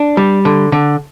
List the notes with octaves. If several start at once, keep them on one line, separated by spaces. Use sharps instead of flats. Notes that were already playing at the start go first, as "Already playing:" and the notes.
Already playing: D4
G3
D3
D3